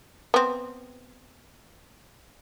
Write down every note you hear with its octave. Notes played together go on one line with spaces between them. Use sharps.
B3 C4